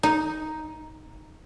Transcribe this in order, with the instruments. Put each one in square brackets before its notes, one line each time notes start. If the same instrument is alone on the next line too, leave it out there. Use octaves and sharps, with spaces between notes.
[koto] D#4